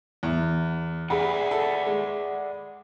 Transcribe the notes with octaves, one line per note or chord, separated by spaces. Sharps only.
E2
G#4 D5 E5 F#5 B5
A4
G#3